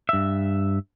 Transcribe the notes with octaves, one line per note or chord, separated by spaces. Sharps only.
G2 E5